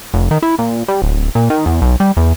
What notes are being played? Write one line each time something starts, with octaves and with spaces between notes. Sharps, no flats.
F1
D#3
E4
A#2
G3
D1
A#2
D#3
E2
B1
G3
E2